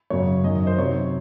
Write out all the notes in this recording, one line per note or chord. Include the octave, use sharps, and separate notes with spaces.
F#2 C#3 F#3 C#5
F#2 D#3 F#3 D#5
D#5
C5
C3 F#3 C4 D#4 C#5